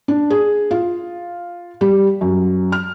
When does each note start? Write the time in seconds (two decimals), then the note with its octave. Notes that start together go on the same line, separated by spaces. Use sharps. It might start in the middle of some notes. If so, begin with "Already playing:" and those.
0.08 D4
0.30 G#4
0.71 F4
1.81 G3
2.21 F#2
2.72 F6